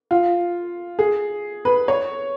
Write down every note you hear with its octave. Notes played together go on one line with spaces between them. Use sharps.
F4
G#4
B4
C#5